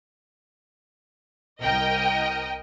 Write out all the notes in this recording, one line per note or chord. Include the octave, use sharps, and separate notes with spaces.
C2 A#4 D#5 G5